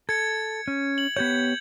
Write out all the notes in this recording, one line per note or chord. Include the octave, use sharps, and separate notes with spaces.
A4 G#6 C#7
C#4
F#7
B3 G4 C#5 G6 G#6